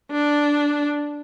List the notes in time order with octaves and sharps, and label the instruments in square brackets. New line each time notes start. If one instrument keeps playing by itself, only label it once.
[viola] D4